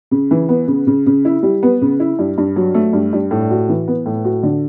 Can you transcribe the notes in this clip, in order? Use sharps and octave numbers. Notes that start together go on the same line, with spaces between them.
C#3
E3
B3
C#3
C#3
C#3
E4
G3
B3
C#3
E4
G2
G2
F#3
A3
G2
G2
A2
F#4
E3
B3
A2
F#4
D3